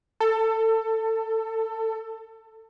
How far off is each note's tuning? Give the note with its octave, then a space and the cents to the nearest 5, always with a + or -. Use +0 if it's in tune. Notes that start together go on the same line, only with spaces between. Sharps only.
A4 +20